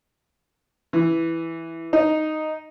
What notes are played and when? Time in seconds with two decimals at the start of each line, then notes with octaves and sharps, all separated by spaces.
0.93 E3
1.93 D#4